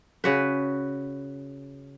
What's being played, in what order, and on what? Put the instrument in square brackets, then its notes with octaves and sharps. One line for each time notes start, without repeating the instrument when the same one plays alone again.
[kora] C#3 F#4 B4